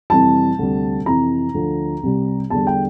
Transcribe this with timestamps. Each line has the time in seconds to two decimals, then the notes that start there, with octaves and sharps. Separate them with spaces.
0.10 F2 C3 E3 G3 A5
0.59 D2 C3 G3
1.06 F2 C3 E3 A#5
1.54 D2 D3 F3
2.03 C2 C3 G3
2.50 E2 D3 G3 A5
2.67 G5